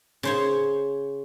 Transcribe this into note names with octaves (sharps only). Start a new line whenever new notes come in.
C#3 C5 C#5